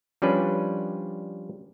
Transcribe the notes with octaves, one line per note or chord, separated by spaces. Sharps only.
F3 G3 C#4 D4 B4